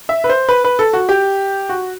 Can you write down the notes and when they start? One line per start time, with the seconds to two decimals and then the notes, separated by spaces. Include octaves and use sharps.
0.09 E5
0.24 B4
0.29 C5
0.49 B4
0.64 B4
0.79 A4
0.93 F#4
1.09 G4
1.69 F#4